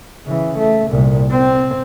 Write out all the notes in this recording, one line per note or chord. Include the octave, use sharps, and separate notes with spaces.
C#3 E3
A3
C2 A#2
C4